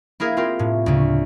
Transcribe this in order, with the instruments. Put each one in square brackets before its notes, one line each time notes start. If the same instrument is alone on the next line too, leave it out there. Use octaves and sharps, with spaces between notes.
[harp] A#3 E4 G#4 A#4
C4 F4 G4 A#4
A2
D2 C#3